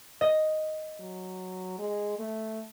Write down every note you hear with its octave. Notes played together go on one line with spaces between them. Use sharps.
D#5
F#3
G#3
A3